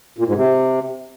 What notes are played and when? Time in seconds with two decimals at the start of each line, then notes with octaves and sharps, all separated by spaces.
0.18 A#2
0.27 G#2
0.36 C3